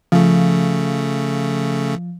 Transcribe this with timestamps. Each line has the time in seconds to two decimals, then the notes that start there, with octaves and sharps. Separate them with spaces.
0.12 C#3 F3 A3